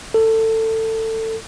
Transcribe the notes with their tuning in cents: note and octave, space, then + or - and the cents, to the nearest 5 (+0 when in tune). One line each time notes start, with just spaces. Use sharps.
A4 +20